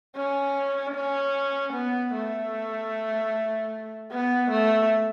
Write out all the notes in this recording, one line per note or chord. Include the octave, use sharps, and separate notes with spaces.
C#4
C#4
B3
A3
B3
A3